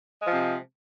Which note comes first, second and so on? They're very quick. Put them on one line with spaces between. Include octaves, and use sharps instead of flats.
G#3 F3 C3